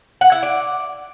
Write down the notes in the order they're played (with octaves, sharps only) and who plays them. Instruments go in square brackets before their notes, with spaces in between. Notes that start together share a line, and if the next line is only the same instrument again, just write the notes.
[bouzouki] F#5
E4
D5